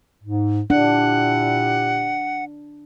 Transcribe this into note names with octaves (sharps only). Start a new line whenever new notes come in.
G#2
A#2 D4 E4 G4 F#5